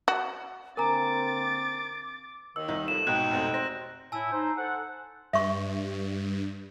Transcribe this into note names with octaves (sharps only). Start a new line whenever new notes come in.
F#4
D3 A#3 C4 A#4 G#5 A#5 D6 A6
D#2 D#3 E6
C2 D#4
A2 F3 A3 E7
G#1 B2 D#4 G5 F#6
F1 B2 C4
C5 A#6
A2 E4 G#5 A5 E6
D#4 C5
A4 C5 F#5
G2 E5 C#6